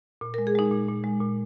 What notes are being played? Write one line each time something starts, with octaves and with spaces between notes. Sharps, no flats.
A#2
G#3 A#4
G#4
G#3 D#4
A#2
A#2
G#3
A#2